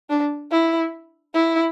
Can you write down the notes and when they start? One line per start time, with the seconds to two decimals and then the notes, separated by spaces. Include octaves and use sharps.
0.09 D4
0.51 E4
1.34 E4